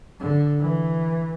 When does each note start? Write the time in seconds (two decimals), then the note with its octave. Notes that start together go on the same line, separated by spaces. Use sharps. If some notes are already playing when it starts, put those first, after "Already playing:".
0.20 D3
0.59 E3